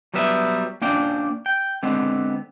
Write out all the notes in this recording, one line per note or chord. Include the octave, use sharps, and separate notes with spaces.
F#3 G3 B3 B4 E5
A#3 C#4 D4 G5
G5
D3 G#3 B3 C4